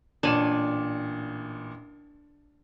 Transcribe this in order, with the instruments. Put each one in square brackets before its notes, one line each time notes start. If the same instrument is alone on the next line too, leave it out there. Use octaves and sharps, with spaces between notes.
[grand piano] A1 A#2 E7 [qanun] D4 C#5 G#5